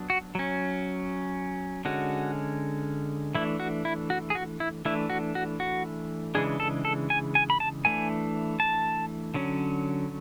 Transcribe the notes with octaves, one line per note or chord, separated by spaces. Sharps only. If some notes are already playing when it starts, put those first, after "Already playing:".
Already playing: F#3 B3 D4
F#4
F#3 C#4
D3 G#3 C#4 F#4
E3 A3 D4 E4
F#4
E4
F#4
G#4
F#4
E4
E3 A3 D4 E4
F#4
F#4
F#4
C#3 E3 G#3 D4 G#4
A4
A4
G#5
G#5
B5
A5
E3 A3 D4 G#5
A5
D3 F#3 C#4